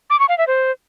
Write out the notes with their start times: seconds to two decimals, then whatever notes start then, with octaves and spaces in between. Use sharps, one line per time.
0.10 D6
0.19 C#6
0.29 F5
0.38 E5
0.47 C5